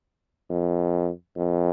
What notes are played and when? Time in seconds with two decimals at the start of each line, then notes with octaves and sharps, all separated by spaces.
0.50 F2
1.37 F2